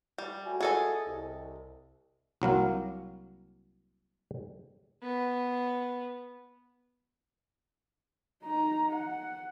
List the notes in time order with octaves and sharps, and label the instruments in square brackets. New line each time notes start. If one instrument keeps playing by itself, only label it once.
[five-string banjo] G3
[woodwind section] A3 F#4 G#5
[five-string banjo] G#4 A4 D#5
[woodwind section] C2
[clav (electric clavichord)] C2 F#3 A#3 F5
[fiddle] B3
[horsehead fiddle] D#4 A#5
F#5